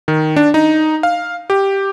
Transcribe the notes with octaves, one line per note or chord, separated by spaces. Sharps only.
D#3
D4
D#4
F5
G4